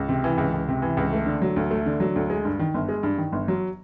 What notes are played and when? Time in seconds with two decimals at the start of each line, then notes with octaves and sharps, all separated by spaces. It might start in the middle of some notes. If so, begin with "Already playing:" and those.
Already playing: C#2
0.09 C3
0.24 E3
0.38 C#2
0.53 C#2
0.68 C3
0.82 E3
0.97 C#2
1.12 A3
1.26 D3
1.42 F#3
1.56 D2
1.71 A3
1.86 D3
2.00 F#3
2.16 D2
2.30 G#3
2.45 G2
2.59 D#3
2.74 G1
2.89 G#3
3.03 G2
3.18 D#3
3.32 G1
3.48 F#3